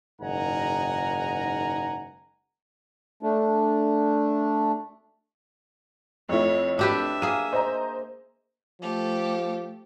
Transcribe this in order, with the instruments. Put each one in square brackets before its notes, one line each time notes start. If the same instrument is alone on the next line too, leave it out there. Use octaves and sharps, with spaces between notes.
[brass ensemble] F#1 G#2 D#3 F#5 G#5 A#5
[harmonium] A3 D4
[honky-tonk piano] F2 A3 E4 [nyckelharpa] C#5
[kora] D4 G4 B4 [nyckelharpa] E5
[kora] A#3 G#4 [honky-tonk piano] D#7
[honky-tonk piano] C5 D#5 A#5
[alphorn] F3 [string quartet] A3 G4 A4